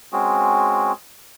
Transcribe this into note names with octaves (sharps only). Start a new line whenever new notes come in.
G#3 C4 C#4 F#4 G#4